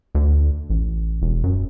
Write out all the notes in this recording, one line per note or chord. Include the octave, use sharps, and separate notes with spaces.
D2
A1
E1
F#2